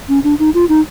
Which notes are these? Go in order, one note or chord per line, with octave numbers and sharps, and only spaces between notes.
C#4
D4
D#4
F4
D#4